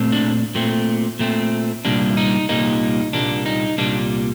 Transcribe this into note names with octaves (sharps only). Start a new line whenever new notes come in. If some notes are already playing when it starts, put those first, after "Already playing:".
Already playing: A#2 A3 C4
D4
A#2 A3 C4
A#2 A3 C4
C2 A#2 G3 A#3 D4
D#4
C2 A#2 G3 A#3 D#4
C2 A#2 G3 A#3 D4
D#4
C2 A#2 G3 A#3 D4